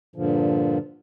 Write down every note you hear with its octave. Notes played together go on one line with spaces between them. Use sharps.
G2 A#2 D3 F3